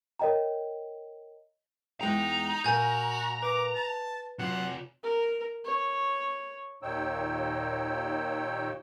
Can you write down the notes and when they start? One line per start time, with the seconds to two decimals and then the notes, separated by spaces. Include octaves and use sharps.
0.19 A#4 C#5 D#5 G5 A#5
2.01 E2 G#3 D#4 G5 A#5
2.64 A#2 F#4 A#4 G#5 G6
3.42 B4 D6
3.75 A5
4.39 C3 F#3 F4 F#5
5.04 A#4
5.65 C#5
6.83 D#2 A#2 D#4 C#5 G5 E6